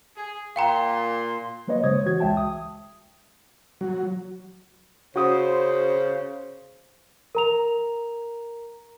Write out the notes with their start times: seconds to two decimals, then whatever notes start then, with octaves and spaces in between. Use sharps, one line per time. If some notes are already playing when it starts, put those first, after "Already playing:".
0.16 G#4
0.56 A#2 F5 G5 A#5 C6
1.68 F#3 A#3 B4 C#5 D#5
1.84 C#3 G#3 C5 C#5 D#6 G#6
2.05 E3 F#4 G#6
2.20 C#2 G#3 E5 G5 A5
2.37 D#6
3.81 F#3
5.16 C#3 F#4 C5 D#6
7.35 A#4 A#5 F7